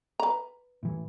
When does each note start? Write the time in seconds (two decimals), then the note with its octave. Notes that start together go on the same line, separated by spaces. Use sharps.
0.20 B4 A#5
0.83 A2 E3